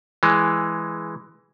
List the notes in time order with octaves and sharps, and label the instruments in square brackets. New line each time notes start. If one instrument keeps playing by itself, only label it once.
[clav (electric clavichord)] E3 G#3